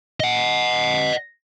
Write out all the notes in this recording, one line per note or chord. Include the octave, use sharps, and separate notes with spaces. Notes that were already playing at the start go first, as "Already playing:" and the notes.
D#5 F#5